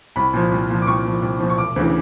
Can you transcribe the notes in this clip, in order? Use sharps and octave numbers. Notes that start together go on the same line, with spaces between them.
C2 B5
A#2 F3
C2
A#2 F3
D6
C2 C#6
A#2 F3
C2
A#2 F3
C#6
E1 D6
D2 C#3 E3